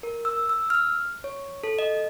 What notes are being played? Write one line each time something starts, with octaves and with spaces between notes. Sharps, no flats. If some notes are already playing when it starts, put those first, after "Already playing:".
A#4
E6
E6
F6
C#5
A4
D#5